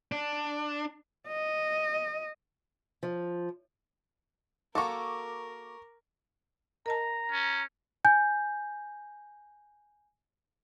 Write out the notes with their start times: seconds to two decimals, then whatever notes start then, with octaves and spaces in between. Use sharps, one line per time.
0.12 D4
1.28 D#5
3.03 F3
4.75 A#3 F#4 A4 A#4 C#6 D6
6.86 A#4 D#5 A5 A#5
7.32 C#4
8.05 G#5 G6